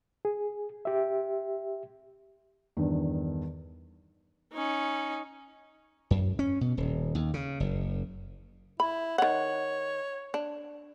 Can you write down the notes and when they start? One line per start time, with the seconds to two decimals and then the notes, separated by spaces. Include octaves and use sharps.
0.25 G#4
0.85 G4 E5
2.77 E2 G2 D#3
4.53 C#4 D#4
6.11 F#2
6.39 C#4
6.61 B2
6.77 D#1
7.15 D#2
7.34 C#3
7.60 F#1
8.80 E4 B5
9.18 D#3 C#5 F#5
10.34 D4